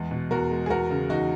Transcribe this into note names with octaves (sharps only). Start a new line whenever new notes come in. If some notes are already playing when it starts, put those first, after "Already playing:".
Already playing: E2 G#3
B2
E2 F#4 A#4
G#3
G#4
E2 F#4 A#4
C#3
E2 D#4 F#4